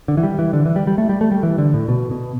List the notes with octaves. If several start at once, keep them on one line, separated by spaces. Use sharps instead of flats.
D3
E3
G3
E3
D3
E3
G3
G3
A3
G3
A3
G3
E3
D3
A2
B2
B2